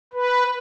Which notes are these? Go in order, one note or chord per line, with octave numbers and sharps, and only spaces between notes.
B4